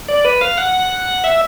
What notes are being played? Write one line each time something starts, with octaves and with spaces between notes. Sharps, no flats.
D5
B4
F5
F#5
E5